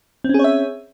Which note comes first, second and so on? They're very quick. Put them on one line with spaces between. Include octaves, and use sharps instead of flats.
C4 C#4 G#4 C#5 E5